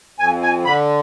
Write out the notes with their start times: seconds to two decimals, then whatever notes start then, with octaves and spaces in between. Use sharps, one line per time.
0.19 F2 G#5
0.42 G#5
0.65 D3 B5